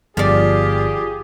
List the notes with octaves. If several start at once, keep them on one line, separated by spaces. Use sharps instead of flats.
G1 F3 F4 G4 G#4 D5